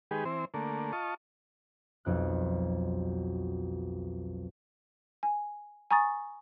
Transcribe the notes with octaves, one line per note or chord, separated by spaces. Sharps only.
D#3 G#3 G4 G#4 B4
E3 C4 C5
D3 A3 A#3
F4 D#5 A5 C#6
B1 F2 F#6
G#5
G#5 A#5 C#6 D#6 A6